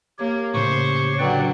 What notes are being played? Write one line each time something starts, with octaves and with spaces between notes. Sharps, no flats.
A#3 G4 C#5
A2 C#3 C5 C#6
D3 F#3 B4 D5 G5